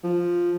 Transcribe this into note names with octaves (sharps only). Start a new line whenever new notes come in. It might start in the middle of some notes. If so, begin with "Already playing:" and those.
F3